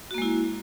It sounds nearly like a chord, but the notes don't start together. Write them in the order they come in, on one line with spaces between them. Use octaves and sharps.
F#4 A#3 G#3 E4